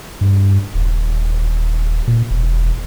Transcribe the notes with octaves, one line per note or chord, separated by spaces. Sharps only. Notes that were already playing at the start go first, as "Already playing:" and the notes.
G2
D#1
A#2
E1